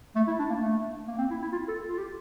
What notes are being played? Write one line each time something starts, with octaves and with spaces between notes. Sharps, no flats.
A3
E4
D4
A#3
A3
A#3
C4
E4
E4
F4
A4
F4
G4